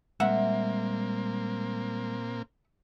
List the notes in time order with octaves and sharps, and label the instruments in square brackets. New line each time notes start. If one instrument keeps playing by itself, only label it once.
[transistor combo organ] A#2 A#3 C4 [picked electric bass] G3 G#3 [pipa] E5 F#5